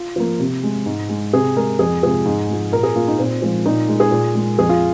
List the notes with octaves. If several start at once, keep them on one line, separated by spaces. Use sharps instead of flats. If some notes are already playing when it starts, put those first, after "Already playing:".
Already playing: F4
F3 A#3
C3
G#3
G#2
G#3
C3 G#4
G#3 A#4
F2 G#4
C3 F3 G#3 G#4
G#2
F3 G#3
A#2 A#4
G#4
A#3 F4
D#4
A#2 C4
F3 G#3
A#2 D#4
G#3
G#4
A#2
G#3
F2 G#4
F4